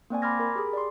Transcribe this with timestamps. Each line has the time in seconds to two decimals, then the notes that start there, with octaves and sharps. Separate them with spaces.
0.10 A#3 C4 D5 G#5
0.22 B5 C6 D6 F6 G#6 A#6
0.40 A#4 B5
0.56 G4 G#4
0.73 D5 C6